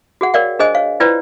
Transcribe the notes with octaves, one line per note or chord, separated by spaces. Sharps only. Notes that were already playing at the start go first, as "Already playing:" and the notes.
F#4 G#4 F#5
A#4 C#5 D5 F5 G5
D4 G#4 C5 D#5 G#5 D#6
C#5 F5
E4 F4 B4 C5 D5 G5